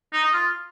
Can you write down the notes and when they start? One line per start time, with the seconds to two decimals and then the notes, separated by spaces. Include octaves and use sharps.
0.13 D#4
0.23 D#5
0.33 F4